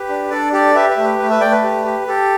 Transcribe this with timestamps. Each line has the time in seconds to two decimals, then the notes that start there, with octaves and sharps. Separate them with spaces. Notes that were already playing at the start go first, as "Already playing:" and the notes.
Already playing: G4 B4
0.09 D4
0.31 D4 A4 D5
0.53 G4 A4 D5
0.75 G4 B4 E5
0.89 B4 E5
0.97 A3
1.04 B4
1.19 A3 B4
1.30 B4 E5
1.41 A3 D5 G5
1.51 B4
1.64 G4
1.85 G4
2.07 G4 A4